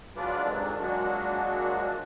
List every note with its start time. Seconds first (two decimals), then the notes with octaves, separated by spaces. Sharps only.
0.16 F#3 G#3 D4 F4 B4 D5
0.44 F2 G#2 C3 D#3 G#3 D4
0.80 F3 F#3 G#3 A#3 D4 F#4